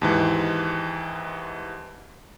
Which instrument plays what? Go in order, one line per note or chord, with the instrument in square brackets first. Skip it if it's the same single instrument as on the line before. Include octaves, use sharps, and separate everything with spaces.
[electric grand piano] D#2 G#2 E3